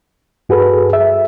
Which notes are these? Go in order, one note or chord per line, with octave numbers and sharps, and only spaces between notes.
G2 F#4 G#4 A4 B4
E5